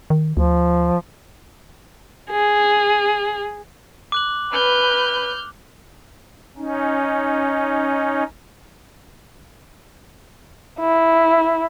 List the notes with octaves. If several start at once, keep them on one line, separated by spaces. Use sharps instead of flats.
D#3
D2 F3
G#4
D6 F#6 F#7
B4 F6 G6
C#4 D#4
E4